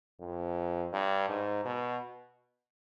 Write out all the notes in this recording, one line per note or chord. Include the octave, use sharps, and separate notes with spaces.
F2
G2
G#2
B2